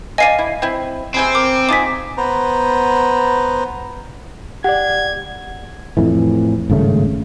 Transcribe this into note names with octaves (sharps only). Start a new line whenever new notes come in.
D5 D#5 F5 G#5 C7 D#7
E4
C4 E4
C3 C4 G#4 B5
A#4 D6
D#4 F4 G#4 D6 B6
B3 B4 C5 A#5
G4 D5 F#5 G#6
F2 A2 E3
G#1 G2 C#3 A3